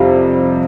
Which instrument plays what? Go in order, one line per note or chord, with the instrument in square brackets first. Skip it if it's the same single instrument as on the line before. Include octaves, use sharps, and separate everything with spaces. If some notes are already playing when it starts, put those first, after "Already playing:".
Already playing: [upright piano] F2 C3 G3 F5